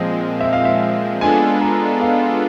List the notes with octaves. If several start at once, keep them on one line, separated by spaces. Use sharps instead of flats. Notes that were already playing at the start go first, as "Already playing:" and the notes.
Already playing: A#2 F3 G#3 C4 D#5
E5
F5
E5
G#3 B3 D4 F4 A4 G#5
A#5
F5